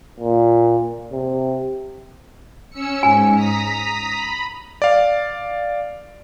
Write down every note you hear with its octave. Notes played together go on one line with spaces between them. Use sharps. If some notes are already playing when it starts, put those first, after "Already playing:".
A#2
C3
C#4 E6 C#7
G#2 G#5
A#5 D#6 B6
B5
D5 F5